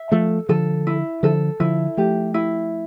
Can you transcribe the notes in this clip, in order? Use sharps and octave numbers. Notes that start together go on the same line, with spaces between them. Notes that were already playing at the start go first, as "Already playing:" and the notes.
Already playing: E5
F3 A3 A4
D3 F3 A4
E4
D3 F3 A4
D3 F3 E4
F3 A3 G4
E4